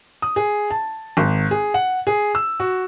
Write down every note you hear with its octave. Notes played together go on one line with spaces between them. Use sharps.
D#6
G#4
A5
G#1
G#4
F#5
G#4
E6
F#4